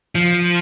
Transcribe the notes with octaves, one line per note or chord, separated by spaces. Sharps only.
F3